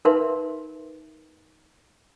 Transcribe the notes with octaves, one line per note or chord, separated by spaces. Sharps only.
D#4 A#4 B4 E5 F5 C6